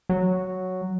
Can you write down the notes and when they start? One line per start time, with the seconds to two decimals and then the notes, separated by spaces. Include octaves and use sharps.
0.09 F#3